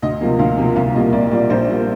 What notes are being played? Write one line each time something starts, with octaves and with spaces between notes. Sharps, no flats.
D2 D#5
C3 F3 A#3
D2 F5
C3 F3 A#3
C2 F5
A#2 G3 A#3 D#5
C2 D5
A#2 G3 A#3 D5
A#1 C5
A#2 G3 A#3